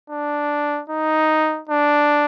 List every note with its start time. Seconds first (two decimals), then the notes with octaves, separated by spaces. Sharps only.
0.10 D4
0.89 D#4
1.69 D4